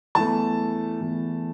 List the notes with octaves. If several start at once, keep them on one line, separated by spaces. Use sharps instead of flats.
E2 E3 A3 A5
E2 E3 A3